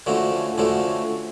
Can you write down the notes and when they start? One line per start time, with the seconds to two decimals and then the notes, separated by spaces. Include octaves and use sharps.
0.06 D3 F3 A3 C#4 F#4
0.58 D3 F3 A3 C#4 F#4